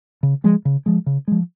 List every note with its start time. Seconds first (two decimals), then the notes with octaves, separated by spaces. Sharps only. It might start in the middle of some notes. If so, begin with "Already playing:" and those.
0.23 C#3
0.44 F3 G#3
0.65 C#3
0.86 F3 G#3
1.06 C#3
1.28 F3 G#3